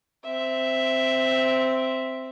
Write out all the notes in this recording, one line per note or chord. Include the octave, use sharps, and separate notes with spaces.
C4 E5